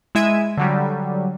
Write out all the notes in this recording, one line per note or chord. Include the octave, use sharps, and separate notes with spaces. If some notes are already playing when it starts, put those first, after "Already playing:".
G#3 E4 E5 G#6 D#7
D3 F#3 G3